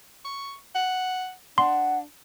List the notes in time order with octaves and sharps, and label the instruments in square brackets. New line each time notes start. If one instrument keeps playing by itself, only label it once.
[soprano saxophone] C#6
F#5
[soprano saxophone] D4 [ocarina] F#5 [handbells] C6